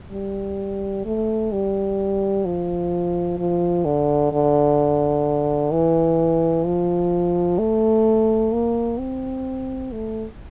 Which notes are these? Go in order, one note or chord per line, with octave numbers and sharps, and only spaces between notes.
G3
A3
G3
F3
F3
D3
D3
E3
F3
A3
A#3
C4
A3